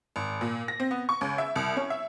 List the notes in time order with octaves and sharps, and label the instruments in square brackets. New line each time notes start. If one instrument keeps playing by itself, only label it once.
[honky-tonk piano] G#1
A#2
A#6
C4
B3
C#6
C#2
E5
C2
C#4
E5